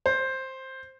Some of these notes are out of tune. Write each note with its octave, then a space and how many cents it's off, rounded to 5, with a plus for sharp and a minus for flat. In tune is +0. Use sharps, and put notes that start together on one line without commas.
C5 +10